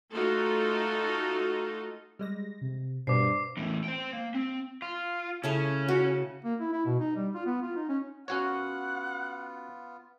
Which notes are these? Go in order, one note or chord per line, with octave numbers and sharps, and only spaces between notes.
A3 D#4 F4 F#4 A4
G3 G#3 A#6
C3
G2 B2 C5 D6 C7
E2 A2
C5 G5
A#3
C4
F4
C#3 A3 C#4 E4
F#4
A#3
E4
E4
B2
D#4
G3
F4
B3
F4
D#4
C#4
B3 C#4 F4 F#4 C#5 F#5